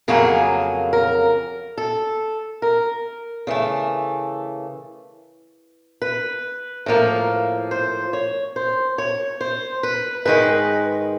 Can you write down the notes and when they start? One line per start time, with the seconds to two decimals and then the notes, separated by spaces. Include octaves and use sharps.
0.08 F2 C#3 F#3 A#3 G#4
0.93 A#4
1.78 A4
2.62 A#4
3.47 C#3 E3 A3
6.02 B4
6.86 A2 F3 A#3
7.71 C5
8.13 C#5
8.56 C5
8.98 C#5
9.41 C5
9.83 B4
10.25 G#2 D#3 G#3 B4